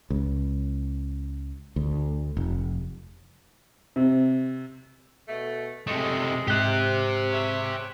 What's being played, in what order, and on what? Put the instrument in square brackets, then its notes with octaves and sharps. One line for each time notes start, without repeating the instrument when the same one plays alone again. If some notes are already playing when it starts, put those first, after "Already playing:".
[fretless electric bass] C#2
D2
F1
[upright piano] C3
[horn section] B2 A3
[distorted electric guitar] C3 A3 [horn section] G#3
[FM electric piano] G#2 F#6 [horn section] C3 [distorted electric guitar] G4 C5
[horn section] G#4 C#5 E5